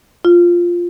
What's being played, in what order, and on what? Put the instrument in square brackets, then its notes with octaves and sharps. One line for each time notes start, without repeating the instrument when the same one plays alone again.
[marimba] F4